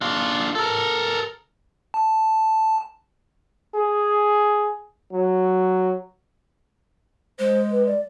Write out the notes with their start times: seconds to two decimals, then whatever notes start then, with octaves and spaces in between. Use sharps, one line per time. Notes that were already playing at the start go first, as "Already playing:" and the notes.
0.01 D4 F4
0.55 A4 A#4
1.94 A5
3.75 G#4
5.12 F#3
7.39 G#3 C5
7.71 B4
7.86 D5